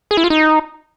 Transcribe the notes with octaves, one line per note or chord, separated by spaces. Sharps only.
G#4
E4
F4
D#4